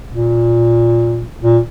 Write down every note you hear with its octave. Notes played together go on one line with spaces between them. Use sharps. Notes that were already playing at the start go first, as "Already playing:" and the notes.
A#2
A#2